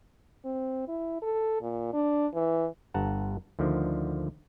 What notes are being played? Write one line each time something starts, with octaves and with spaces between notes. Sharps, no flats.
C4
E4
A4
A#2
D4
E3
G1 G2 F#5 A5 A#5
D2 D3 D#3 F3